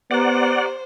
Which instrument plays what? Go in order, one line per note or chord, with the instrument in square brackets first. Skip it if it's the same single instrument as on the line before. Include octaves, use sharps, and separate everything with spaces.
[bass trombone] B3 [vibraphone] G4 A#5 [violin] C5 [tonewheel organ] D5 F#5